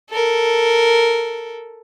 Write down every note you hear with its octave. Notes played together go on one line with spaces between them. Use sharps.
A4 A#4